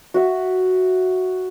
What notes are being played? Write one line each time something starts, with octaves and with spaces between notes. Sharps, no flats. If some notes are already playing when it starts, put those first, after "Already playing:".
F#4 E5